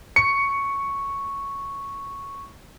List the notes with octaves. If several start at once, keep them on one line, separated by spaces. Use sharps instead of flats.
C#6 C#7